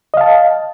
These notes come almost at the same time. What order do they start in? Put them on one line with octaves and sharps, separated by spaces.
D#5 F5 A5